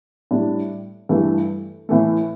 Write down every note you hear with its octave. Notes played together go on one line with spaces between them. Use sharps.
A2 G3 D4
G2 E3 A3
A2 E3 A3